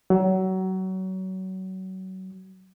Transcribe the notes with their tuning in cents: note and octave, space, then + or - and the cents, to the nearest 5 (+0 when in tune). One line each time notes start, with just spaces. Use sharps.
F#3 +25